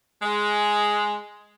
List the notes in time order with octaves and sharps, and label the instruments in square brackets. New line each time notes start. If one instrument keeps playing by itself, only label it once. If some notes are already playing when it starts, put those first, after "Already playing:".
[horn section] G#3